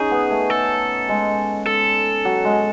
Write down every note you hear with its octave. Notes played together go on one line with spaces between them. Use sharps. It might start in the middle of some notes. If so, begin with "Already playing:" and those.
Already playing: C#4 D#4 G#4
B3
A3
A4
G#3
A4
F#3
G#3